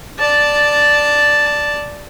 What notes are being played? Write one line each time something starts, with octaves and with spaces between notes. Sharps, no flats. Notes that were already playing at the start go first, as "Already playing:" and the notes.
D5 A5